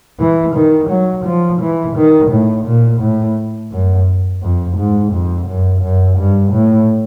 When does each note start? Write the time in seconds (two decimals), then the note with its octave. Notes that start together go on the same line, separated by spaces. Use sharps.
0.20 E3
0.55 D#3
0.89 F#3
1.25 F3
1.60 E3
1.96 D#3
2.31 A2
2.65 A#2
3.01 A2
3.72 F#2
4.41 F2
4.77 G#2
5.12 F2
5.47 F#2
5.82 F#2
6.18 G2
6.52 A2